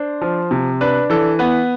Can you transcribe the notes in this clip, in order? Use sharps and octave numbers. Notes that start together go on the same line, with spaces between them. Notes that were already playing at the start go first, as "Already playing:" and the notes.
Already playing: D4 C5
F3
C3
D4 B4
E3 A4
B3 B4